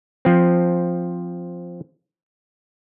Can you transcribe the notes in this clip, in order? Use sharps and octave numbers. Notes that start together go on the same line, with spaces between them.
F3 C4